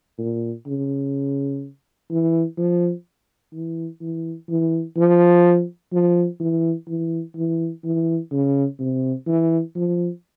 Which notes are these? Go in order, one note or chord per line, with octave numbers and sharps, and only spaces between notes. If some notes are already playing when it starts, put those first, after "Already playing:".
A#2
C#3
E3
F3
E3
E3
E3
F3
F3
E3
E3
E3
E3
C#3
C3
E3
F3